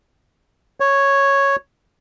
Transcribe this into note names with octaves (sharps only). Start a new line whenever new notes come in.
C#5